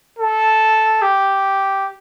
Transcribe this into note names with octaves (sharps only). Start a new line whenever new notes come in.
A4
G4